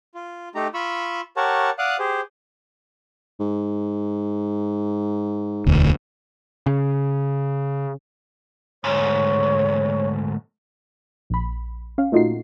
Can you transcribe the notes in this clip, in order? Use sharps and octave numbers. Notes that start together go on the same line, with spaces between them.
F4
A3 D#4 G4 A#5
F4 B5 C#6 E6
G4 A#4 C#5 F#5 A5 C#6
D5 F5 F#5 D6 D#6 F#6
G4 G#4 C5
G#2
E1 D2
C#3
D2 G#2 C#5
A#1 B5
C#4 F5
A#2 A3 D#4 F4 F#4 C7